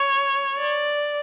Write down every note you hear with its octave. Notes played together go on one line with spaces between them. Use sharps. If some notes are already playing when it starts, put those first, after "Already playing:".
Already playing: C#5
D5